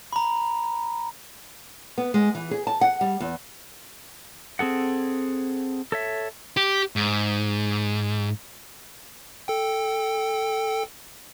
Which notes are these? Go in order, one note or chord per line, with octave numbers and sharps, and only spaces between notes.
A#5 B5
B3
G#3
E3
G#4
A5
F#5
G3
E2
C4 G#4 A4 F#5
A4 C#5 E5
G4
G#2
A4 G5